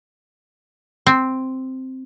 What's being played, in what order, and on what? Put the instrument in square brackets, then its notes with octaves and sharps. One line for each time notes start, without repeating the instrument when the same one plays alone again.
[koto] C4